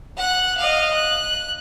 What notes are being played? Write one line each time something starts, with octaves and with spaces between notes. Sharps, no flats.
F#5 F#6
D#5 F5
F#6